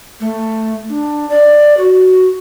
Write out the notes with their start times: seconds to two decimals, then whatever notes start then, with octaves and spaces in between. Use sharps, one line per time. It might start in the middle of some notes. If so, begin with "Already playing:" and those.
0.20 A3
0.89 D4
1.29 D5
1.77 F#4